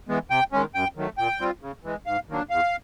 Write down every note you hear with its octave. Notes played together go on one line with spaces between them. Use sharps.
E3 G#3 B3
C3 G5
D#3 G#3 C#4
F#2 G5
D#3 F#3 A3
A#2 G5
G3 C4 F4
C#3
E3 G#3
G#2 F5
D#3 F#3 A#3 D4
E2 F5